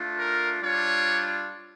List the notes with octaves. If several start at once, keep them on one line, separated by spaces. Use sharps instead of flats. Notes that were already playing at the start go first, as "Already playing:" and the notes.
Already playing: A3 D4 F4
A#4
G3 D4 F4 C#5